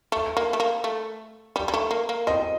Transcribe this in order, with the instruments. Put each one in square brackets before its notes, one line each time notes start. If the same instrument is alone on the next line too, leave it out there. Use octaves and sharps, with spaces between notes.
[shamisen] A3
A#3
A3
A#3
A3
G3
G3
A3
A#3
A#3
[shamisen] C4 [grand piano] D#5